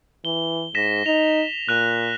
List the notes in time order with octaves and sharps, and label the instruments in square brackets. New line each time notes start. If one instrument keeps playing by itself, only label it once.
[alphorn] E3 [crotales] G7
[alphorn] G#2 [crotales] A#6 B6 E7
[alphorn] D#4 [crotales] F7
[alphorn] A#2 [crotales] F#6 F7